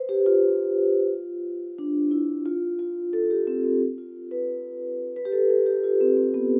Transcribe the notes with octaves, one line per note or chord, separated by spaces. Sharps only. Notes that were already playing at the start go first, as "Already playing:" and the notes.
Already playing: B4 C5
G4
F4
D4
E4
F4
F4
A4
G4
C4
C4
F4
B4
B4
G4
A4
A4
G4
F4
C4
C4
B3